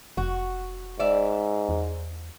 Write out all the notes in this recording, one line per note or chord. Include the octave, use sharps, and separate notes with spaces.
F1 F#4
G#2 D5 E5
E2